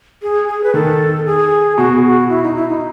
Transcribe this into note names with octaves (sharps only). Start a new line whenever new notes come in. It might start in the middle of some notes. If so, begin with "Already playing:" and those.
G#4
G#4
B4
D#3 A4
G#4
B2 F#4
G#4
F#4
E4
D#4
E4
D#4